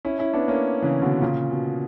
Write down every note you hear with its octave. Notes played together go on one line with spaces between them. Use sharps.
C#4 E4
C#4 E4
B3 D4
A#3 C#4
C#3 E3
B2 D3
A#2 C#3
B2